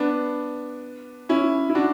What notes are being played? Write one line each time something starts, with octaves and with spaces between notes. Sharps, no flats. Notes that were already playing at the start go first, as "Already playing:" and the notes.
Already playing: B3 D4
C#4 E4
E4
D4 F#4